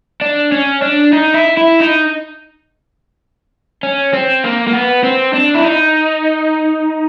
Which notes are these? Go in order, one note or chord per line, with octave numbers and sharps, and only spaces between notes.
D4
C#4
D4
D#4
E4
E4
D#4
C#4
C4
A#3
A#3
B3
C4
D4
E4
D#4